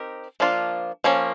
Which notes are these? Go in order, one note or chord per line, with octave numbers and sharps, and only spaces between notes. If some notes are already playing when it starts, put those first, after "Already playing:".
Already playing: C4 D#4 G4 A#4
F3 A#3 D4 F4
F3 A#3 C#4